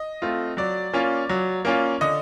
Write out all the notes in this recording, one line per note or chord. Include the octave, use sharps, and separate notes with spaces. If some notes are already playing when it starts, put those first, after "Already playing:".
Already playing: D#5
A3 C4 F4
F#3 D5
A#3 C#4 F4
F#3
A#3 C#4 F4
D3 D#5